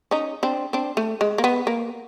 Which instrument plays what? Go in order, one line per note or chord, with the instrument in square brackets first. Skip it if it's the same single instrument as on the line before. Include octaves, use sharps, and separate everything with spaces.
[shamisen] C#4 D#4
C4 D4
C4 D4
A3
G#3
A#3
B3
A#3